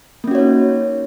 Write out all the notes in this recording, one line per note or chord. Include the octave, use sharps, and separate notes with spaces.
A#3 C#4 D#4 F#4 C#5